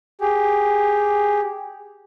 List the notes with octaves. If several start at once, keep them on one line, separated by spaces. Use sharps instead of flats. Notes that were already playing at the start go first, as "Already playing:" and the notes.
G4 G#4